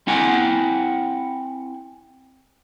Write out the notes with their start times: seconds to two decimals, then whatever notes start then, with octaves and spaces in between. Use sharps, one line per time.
0.07 C4 E4 F#5 G#5